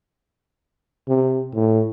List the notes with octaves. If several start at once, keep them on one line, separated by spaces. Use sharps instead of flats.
C3
A2